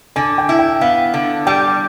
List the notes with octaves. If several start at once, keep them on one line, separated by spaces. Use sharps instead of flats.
D3 G#5
G5
E4
G5
B3 F5
D3
G3 G5